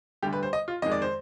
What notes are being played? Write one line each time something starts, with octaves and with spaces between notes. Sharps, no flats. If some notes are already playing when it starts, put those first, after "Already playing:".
D2 D3 G3 G4
B4
C5
D#5
F4
F2 D#3 G#3 D#5
D5
C5